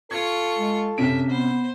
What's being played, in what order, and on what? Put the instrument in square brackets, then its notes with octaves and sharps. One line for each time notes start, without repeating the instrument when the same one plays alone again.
[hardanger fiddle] F4 C#6 [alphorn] A4 [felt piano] G#6
[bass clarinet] G#3
[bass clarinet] F#2 [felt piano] C3 C#4 D7 [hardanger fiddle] E5
[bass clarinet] B3 [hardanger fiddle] C5